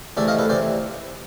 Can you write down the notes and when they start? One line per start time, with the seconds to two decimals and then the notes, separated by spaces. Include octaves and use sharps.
0.17 C3 E3 A3 D5 E5
0.28 D#5 F5
0.39 A4 B4
0.49 C3 E3 C5 D5